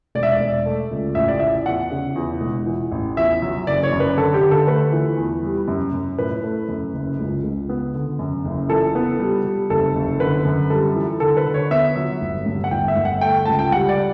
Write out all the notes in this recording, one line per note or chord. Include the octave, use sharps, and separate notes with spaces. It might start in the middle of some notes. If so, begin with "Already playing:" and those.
E1 D5
E5
D5
E1
A3
C#2
A1 E5
D5
A2 E5
E2 F#5
C#3
E2
E1
E3
A1
E2 E5
F#3
F#1 D5
C#5
F#2
B4
D3 A4
G4
D3
A4
A3 B4
E3
E2
G3
F#2
F#2
A2 B4
A3
F#2
F#1
C#2
C#2
B3
D3
F#2
F#1
E3 A4
B3
G3
G3
F#1 A4
F#1
D3 B4
F#2
G3 A4
E3
D3 A4
B4
D3
C#5
B3 E5
F#3
G1
G2
F#5
G1 G5
E5
G1
F#5
A3 G5
C#2 A5
G5
G3 F#5
D5